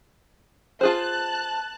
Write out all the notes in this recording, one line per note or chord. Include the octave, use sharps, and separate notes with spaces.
F4 G#4 C5 A5 F#6